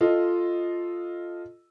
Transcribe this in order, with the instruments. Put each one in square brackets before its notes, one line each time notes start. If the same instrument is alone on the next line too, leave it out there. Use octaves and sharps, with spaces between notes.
[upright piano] F4 A4 D#5